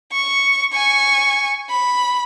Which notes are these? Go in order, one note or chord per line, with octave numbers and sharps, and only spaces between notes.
C#6
G#5 C#6
B5